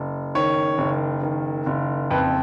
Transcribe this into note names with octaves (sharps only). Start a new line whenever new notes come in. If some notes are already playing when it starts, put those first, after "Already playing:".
Already playing: F#1
D#3 C#5
F#1
D#3
F#1
F2 B4